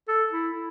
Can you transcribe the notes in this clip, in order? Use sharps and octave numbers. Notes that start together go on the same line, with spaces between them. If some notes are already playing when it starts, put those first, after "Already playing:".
A4
E4